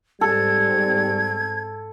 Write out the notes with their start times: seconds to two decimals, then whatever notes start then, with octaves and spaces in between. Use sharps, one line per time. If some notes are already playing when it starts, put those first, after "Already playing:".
0.21 G#2 G3 C4 A4 G#6